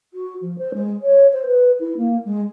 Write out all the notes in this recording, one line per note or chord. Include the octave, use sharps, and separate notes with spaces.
F#4
F3
C5
G#3
C#5
C5
B4
E4
A#3
G#3